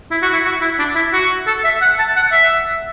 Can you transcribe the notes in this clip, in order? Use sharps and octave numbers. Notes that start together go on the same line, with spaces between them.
E4
F#4
E4
F#4
E4
D4
E4
F#4
A4
E5
F#5
A5
F#5
E5